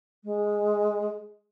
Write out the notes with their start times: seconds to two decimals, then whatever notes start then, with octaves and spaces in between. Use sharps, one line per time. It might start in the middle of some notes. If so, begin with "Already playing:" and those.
0.24 G#3